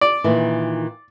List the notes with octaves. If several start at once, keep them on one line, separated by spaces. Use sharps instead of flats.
D5
A#2 D#3 E3